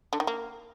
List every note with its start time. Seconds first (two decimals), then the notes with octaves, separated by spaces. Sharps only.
0.13 D3
0.20 D#3
0.27 A#3